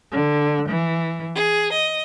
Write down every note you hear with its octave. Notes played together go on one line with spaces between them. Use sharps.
D3
E3
G#4
D#5